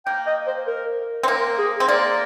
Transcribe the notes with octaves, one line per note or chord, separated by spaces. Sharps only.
A#3 G5
D#5
C5
A#4
C4
A#3 A#4
G#4
C4
A#3 D5